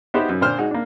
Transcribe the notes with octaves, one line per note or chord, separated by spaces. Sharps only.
B3 D#4 F#4 G4 C5 E5
F#2
A#2 D3 C5 F6
G#3 D#4 F#4
A#3 D4